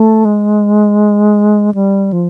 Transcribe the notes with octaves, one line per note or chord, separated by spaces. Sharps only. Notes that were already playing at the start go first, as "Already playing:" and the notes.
Already playing: A3
G#3
G3
F3